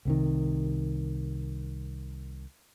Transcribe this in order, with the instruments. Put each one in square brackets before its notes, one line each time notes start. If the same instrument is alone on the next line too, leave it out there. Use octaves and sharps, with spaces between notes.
[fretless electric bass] C2 C3 D#3